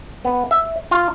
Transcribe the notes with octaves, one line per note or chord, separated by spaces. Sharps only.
B3
E5
F4